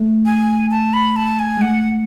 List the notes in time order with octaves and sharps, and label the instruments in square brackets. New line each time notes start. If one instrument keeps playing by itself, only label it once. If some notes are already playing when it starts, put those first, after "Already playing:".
Already playing: [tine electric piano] A3
[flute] G#5
A5
B5
A5
G#5
[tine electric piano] G#3
[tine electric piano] A3 [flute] F#5